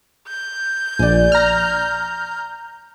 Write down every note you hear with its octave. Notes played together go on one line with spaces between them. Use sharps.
G6
A#1 D5 G#5
A#5 F6